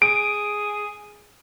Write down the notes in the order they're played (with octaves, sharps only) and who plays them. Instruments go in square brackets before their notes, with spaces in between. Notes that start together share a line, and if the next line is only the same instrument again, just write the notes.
[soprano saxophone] G#4 [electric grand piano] D7